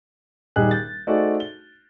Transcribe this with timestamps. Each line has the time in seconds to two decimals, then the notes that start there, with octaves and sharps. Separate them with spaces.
0.56 D#1 G3 D#4 G#4 F#6
0.71 G6 A6
1.07 A3 D#4 F#4 G#4 C5 D5
1.40 G7